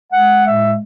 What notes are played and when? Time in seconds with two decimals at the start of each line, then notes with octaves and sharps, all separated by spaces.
0.13 G#3 F#5
0.45 A2 E5